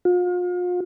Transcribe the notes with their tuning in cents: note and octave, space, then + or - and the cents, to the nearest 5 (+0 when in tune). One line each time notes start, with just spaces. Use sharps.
F4 +40